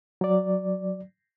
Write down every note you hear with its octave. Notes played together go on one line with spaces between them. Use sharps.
F#3 D5